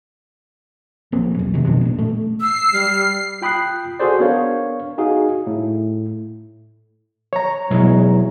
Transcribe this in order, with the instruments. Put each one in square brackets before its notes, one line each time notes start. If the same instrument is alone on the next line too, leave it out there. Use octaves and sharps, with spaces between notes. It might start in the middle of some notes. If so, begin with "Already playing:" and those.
[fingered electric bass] A#1 A#3 C4
B1 E2
F2 C3 D#3
F2 B2 B3 D4
A1 A#2
A3
[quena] E6 [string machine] C7
[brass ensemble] G3 [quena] F6
[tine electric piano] F4 G5 B5 D#6 F#6 C7
F#4 G#4 A4 C5 D5
B3 D4 A#4 C#5 F5
D#4 F#4 G#4 F5
A2
[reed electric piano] C#5 A#5
[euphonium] E2 [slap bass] B2 F#3 G#3